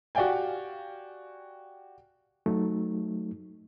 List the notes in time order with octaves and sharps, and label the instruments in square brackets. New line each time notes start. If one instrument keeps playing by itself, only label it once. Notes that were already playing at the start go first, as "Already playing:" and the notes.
[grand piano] F#4 G4 D5 F5 G5 G#5
[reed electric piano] F#3 A3 D#4